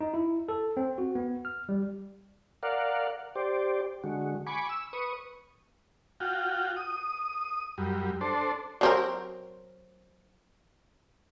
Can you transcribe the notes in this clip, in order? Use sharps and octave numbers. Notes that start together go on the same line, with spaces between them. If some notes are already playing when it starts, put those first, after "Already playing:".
D#4
E4
A4
C4
F#4
B3
F6
G3
A#4 D5 F5 F#5
G4 C5 D5
D3 G#3 F#4
G#5 B5 C#6 D6
E6
B4 C#6 D#6
F4 F#4 G5
D#6
F#2 G3
D4 A4 C5
F#3 C4 A#4